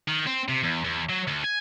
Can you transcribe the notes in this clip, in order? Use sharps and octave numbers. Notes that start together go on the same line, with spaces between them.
D#3
C4
C3
E2
E2
F#3
D2
G#5